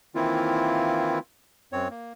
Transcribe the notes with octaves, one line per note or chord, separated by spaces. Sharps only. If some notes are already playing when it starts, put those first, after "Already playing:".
D#3 E3 A#3 C4 E4 F4
F#2 C4 C#5
A#3